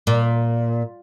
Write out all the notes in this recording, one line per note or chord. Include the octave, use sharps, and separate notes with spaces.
A#2